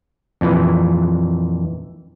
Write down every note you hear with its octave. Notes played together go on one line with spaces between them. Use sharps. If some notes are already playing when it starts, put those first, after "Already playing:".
F2 A#2 E3